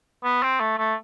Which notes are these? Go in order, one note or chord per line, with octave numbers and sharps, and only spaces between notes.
B3
C4
A3
A3